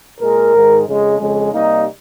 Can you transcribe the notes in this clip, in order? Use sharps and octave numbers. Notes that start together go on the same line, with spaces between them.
A#2 G#3 A#4
G#2 D#3 G#3
F2 C#3 G#3
F2 C#3 G#3
C3 G3 A#3 D#4